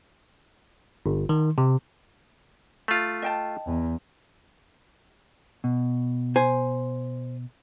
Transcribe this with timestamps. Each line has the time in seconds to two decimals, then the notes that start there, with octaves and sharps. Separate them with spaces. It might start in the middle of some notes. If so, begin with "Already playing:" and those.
1.06 G1
1.29 D#3
1.58 C3
2.88 A3 F4
3.22 D#5 G5 A5
3.66 E2
5.64 B2
6.36 C5 G#5